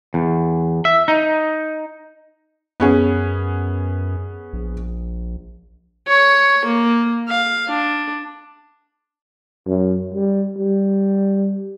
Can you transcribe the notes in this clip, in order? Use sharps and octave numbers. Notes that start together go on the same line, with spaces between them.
E2
E5
D#4
F#2 B3 C#4 G#4
A#1
C#5 C#6
A#3
F5
D4
F#2
G3
G3